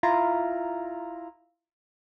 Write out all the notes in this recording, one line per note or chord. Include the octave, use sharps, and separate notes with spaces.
E4 F4 A#5